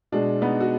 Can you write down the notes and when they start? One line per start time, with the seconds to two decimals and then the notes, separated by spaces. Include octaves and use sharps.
0.12 B2 G#3 D4
0.42 B3 D#4
0.60 F#4